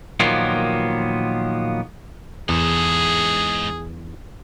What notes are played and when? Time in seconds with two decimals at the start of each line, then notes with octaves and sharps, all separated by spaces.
0.20 A#2 D#3 F3 F#3 A#3 B3
2.49 E2 G#2 G#4 A4